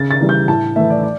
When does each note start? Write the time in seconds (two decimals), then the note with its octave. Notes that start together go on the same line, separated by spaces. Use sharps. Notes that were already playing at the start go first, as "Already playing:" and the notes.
Already playing: C#3 A6
0.11 A6
0.20 E3 G3
0.29 G6
0.48 A2 A5
0.76 E3 A3 E5
0.90 D5
1.03 D5